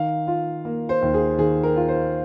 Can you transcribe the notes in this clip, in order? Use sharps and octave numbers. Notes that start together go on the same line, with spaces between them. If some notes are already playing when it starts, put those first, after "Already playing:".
Already playing: D#3 F5
F4
A#3
C5
D#2
G#4
D#3 G#4
A#4
F4
C5